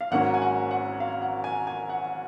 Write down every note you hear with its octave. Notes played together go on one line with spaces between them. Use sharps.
F5
G#1 G#2 F#3 A#3 C#4 F#5
G#5
F#5
F#5
F5
F#5
G#5
G#5
F#5